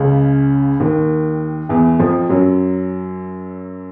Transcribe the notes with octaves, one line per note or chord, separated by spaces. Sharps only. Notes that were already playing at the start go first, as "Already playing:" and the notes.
Already playing: C#2 C#3
D#2 D#3
E2 E3
F2 F3
F#2 F#3